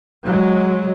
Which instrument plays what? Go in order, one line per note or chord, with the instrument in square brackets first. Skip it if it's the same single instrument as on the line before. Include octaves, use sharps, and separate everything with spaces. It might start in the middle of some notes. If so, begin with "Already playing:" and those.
[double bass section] F#3 G#3